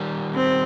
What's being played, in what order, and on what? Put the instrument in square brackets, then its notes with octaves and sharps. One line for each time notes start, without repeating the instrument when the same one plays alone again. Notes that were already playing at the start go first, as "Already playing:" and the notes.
Already playing: [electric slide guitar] D#3 G3
[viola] C4